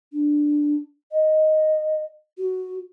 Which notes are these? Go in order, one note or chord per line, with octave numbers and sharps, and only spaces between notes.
D4
D#5
F#4